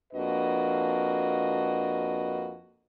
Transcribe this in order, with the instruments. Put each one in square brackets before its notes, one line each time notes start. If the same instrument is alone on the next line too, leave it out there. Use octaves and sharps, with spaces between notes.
[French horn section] F2 A#3 D4 F#4 B4 D#5